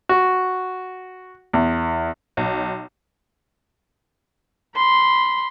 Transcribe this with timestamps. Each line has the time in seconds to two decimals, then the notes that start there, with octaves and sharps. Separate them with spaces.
0.09 F#4
1.53 E2
2.37 B1
4.76 B5 C6